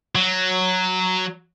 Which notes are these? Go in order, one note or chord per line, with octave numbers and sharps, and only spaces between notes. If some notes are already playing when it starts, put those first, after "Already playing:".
F#3